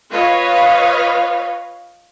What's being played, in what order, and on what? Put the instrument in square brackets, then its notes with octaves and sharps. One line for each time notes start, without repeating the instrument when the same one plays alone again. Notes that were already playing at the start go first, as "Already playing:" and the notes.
[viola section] F4 B4 C#5 D#5 F5